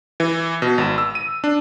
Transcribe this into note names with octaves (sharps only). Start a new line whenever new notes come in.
E3
B2
G#1
E6
D#7
D4